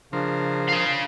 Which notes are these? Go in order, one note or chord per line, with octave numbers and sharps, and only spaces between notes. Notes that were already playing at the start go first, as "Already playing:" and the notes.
C#3 F3 D4 A#4 C5
G#4 F5